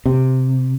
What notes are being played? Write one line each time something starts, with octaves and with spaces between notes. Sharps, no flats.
C3